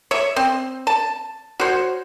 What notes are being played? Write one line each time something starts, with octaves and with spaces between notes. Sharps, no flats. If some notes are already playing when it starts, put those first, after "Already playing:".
C#5 E5
C4
A5
F#4 C5 C#5